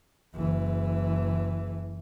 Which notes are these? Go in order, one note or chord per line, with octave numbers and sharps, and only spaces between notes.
F#1 E3